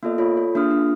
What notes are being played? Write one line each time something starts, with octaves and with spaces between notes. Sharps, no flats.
A#3 B3 F4 A4 D5 D#5
F4 A4 C#5 D5 B5
F4
A#3 D4 F4 G#4 D#6 F6
D4 F4